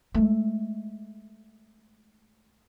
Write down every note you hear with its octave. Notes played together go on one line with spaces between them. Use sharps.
G#3 A3